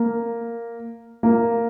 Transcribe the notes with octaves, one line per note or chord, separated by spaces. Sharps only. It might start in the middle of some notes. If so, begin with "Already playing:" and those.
Already playing: A#3
A#3